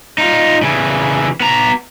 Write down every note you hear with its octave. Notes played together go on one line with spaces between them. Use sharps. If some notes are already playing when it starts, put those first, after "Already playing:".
D#4 F4
C#3 E3
B3 A#5